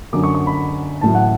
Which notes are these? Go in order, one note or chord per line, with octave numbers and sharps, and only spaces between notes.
F#2 D3 F#3 D6
C#6
C#6
B5
A1 A2 F#3 A5
F#5